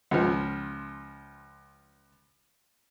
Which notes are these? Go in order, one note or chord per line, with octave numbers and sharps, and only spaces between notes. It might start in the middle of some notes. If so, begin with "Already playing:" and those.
C#2 F3